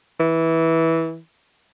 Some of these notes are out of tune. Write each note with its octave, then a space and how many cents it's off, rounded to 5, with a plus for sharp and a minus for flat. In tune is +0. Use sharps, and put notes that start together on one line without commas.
E3 -15